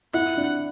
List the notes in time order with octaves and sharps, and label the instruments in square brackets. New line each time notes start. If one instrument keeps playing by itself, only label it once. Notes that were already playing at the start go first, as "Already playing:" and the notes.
[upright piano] E4 [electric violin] F#5
[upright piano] D4